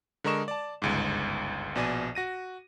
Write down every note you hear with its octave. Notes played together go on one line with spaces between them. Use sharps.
D3 G#3 A#4 D#5 C#6 E7
D5 A5
G1 C#2 G#2
A#1 B2 D5 G#5 D#7
F#4 A#6 D#7